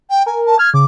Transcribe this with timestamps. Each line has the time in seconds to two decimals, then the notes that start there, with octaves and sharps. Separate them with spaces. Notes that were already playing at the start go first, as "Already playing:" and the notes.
0.10 G5
0.26 A#4 G#5
0.46 A5
0.59 F6 G#6
0.74 C#3 D6